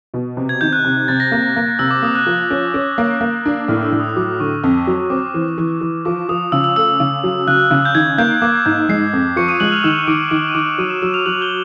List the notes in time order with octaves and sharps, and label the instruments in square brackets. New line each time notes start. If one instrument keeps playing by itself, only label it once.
[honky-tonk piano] B2
C3
[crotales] G#6
[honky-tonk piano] D#3 [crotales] G6
[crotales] F#6
[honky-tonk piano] C3
[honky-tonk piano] C3 [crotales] A6
[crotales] A#6
[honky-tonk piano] A#3
A#3
[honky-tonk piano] C3 [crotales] E6
[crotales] D6
[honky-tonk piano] A#3 [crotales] D#6
[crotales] F#6
[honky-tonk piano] F3
C#4
C#4
A#3
A#3
D4
[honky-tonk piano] A2 [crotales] F6
[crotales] E6
[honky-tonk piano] A2
[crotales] D#6
[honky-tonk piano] F#3 [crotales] D6
[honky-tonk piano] D3 [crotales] C#6
[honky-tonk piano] F2
F#3
[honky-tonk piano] C4 [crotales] D6
[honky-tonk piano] E3
E3
E3
[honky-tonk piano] F3 [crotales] D6
[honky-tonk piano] F3 [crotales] D#6
[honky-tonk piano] C#3 [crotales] E6
[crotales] E6
[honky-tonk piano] A3 [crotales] E6
[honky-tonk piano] C#3
F#3
[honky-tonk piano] C#3 [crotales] F#6
[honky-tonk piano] C#3
[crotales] G6
[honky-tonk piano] D#3 [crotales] G#6
[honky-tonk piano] A#3 [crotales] G6
[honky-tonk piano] A#3 [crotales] D6
[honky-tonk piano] G#2 [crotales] G6
[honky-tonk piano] G#3 [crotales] C7
[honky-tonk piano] F2
[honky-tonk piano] F3 [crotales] C#6 C#7
[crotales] D#6 D#7
[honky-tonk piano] G#3 [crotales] F#6 F#7
[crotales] F6 F7
[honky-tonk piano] D#3 [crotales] E6 E7
[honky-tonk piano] D#3 [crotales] D6 D7
[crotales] D#7
[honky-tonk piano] D#3 [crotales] D6 D7
[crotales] D#7
[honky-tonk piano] D#3 [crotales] D6 D7
[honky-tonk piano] F#3 [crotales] D#6 D#7
[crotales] E6 E7
[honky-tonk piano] F#3 [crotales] E6 E7
[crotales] F6 F7
[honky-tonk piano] F#3 [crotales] F#6 F#7
[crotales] G6 G7